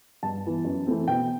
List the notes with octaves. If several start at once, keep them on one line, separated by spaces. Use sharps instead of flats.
G2 A5
E3 B3
F#2
E3 A3 C4
B2 G5